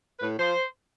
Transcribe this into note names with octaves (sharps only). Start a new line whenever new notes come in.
A2 B4
F3 C5